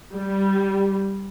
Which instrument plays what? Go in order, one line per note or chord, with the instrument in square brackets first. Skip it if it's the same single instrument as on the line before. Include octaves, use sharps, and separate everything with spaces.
[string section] G3